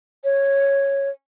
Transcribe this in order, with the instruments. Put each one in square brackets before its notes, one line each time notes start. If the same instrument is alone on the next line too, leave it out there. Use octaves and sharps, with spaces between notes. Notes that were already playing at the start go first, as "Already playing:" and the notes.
[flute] C#5